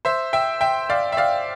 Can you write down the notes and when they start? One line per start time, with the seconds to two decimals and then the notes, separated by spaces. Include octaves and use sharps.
0.05 C5 E5
0.33 E5 G5
0.61 E5 G5
0.90 D5 F5
1.12 E5
1.17 D5 F5